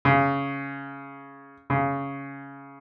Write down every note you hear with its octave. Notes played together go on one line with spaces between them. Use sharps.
C#3
C#3